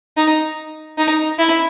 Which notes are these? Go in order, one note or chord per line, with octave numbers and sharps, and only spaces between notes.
D#4
D#4
E4